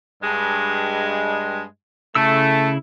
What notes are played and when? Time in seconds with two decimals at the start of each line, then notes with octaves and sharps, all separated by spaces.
0.22 G2 G#3
2.15 C#3 A3 E4 E6